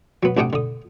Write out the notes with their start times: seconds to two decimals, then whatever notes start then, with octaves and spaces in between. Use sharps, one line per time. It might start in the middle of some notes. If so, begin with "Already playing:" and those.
0.23 F#3 B3
0.37 A1 C3 D4 F#5 G5 D#6
0.53 D3 D#6